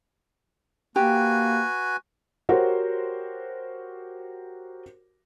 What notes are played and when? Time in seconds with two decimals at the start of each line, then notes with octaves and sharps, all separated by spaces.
0.96 A#3 F#4 G4 B4 G#5
2.49 F#4 G4 A#4 C5 C#5 F#5